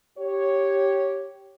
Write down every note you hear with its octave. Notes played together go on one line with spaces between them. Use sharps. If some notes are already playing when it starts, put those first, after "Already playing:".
G4 C#5